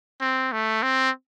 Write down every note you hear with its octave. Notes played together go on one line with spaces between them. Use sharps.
C4
A3
C4